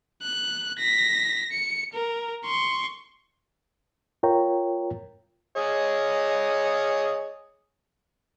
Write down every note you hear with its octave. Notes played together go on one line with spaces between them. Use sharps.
F#6
A#6 B6
C#7
A#4
C6 C#6
F4 A#4 C#5 G5 A#5
G#4 C#5 D#5